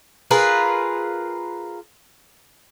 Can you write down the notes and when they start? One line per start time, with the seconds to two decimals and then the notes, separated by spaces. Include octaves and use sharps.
0.31 F4 G#4 A#4 B4